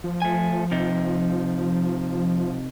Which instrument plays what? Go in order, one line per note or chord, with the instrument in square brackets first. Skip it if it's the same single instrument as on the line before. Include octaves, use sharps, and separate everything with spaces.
[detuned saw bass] F3
[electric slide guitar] A3 G#5
C3 D#4